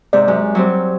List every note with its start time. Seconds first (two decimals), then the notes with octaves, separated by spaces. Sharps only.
0.13 G#2 C3 D5
0.28 F#2 G#3
0.55 F#3 G3 C4